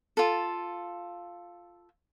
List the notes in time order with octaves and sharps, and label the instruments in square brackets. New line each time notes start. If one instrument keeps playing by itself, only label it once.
[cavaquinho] F4 A4